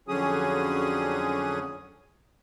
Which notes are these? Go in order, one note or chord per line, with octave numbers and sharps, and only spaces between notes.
F2 D3 F#3 C#4 G#4 D#6